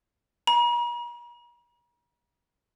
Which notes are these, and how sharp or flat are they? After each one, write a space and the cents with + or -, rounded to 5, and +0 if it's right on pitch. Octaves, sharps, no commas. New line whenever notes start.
A#5 +45